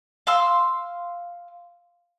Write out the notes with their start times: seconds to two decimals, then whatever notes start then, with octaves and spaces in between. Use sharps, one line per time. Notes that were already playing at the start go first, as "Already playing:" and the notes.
0.27 F5 C6 E6